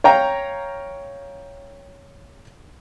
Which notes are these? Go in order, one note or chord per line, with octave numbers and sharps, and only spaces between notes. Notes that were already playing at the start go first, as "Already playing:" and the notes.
C#5 F5 G5 A#5